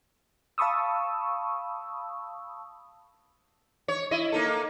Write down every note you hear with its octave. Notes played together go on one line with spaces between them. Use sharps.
F5 A5 B5 C#6 D#6 E6
C#5
E4 D#5
A#3 D#4 A4